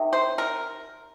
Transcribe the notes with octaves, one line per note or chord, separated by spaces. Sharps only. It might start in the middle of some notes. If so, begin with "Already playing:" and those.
Already playing: C3 D#3
C5
A#4